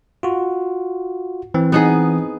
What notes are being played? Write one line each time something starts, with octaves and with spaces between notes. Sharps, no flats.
F4 F#4
E3 C4
B3 D#4 G#4